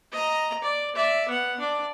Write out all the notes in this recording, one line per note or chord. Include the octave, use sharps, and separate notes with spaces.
D#5 A#5
D5
D5 E5
B3 F#5
D4 D5